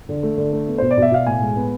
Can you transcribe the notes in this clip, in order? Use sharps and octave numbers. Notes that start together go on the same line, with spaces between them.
D3
A3
D3
A3
B3
B2 C5
D5
B2
E5
B2 F5
A2 G#5
G#3
B3